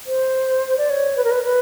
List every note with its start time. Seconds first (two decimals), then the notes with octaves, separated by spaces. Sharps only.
0.07 C5
0.78 D5
0.90 C#5
1.17 B4
1.24 A#4
1.31 B4
1.44 B4